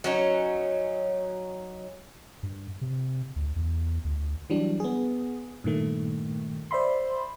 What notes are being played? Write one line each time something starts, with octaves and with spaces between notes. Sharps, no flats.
F#3 C#4 D#4
G2
C3
D2
E2
D2
E3 F#3 G3 D4
B3 G#4
G2 A#2 D#3 A3
C5 D5 E5 B5 C6